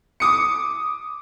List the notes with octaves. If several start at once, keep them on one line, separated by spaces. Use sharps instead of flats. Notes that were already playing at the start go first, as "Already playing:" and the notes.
D6 D#6 C#7